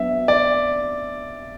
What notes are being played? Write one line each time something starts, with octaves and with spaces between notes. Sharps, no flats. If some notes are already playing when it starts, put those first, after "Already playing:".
Already playing: F#3 B3 D4 E5
D5